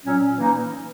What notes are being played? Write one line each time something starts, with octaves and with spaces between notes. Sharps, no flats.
A#2 F#3 C#4
E3 A#3 D#4